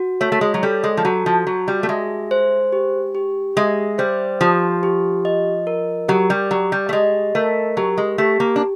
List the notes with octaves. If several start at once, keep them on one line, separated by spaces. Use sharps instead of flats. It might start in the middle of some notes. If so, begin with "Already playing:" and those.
Already playing: F#4
A3 C#5
A3
G#3
F#3
G3 A4
G#3
F3
F#3 F#4
F3
F#3 F#4
G3
A3
G#3 E5
C5
G4
G4
G#3 E5
G3 C5
F3 G4
G4
D#5
A#4
F#3 G4
G3
F#3 G4
G3
A3
G#3 D#5
A3 A#4
F#3 G4
G#3
A3 G4
A#3
D4